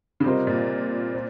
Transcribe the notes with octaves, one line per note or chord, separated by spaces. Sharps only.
C#3
C3 G3 C4 F4 A#4 D#5
A#2
C5